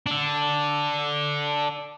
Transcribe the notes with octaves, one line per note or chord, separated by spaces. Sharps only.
D4 A4